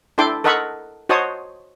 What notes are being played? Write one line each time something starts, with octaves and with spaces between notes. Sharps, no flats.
D4 E4 A4 G5 C6 D6
A4 A#4 D#5 F#5 B5 C#6
F#4 C5 C#5 D#5 A5 D#6